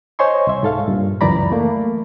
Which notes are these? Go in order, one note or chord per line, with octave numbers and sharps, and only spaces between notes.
C5 C#5 D#5 G#5 C6 C#6
C2 E5
G#2 A4 F5
G2 A#2
C#2 F#2 E3 D5 A#5 B5
A3 A#3